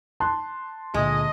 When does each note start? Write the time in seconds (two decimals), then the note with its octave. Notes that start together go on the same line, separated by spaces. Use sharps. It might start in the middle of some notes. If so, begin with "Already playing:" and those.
0.20 A5 C6 F#6
0.94 C#2 A#2 D3 G#3 D#5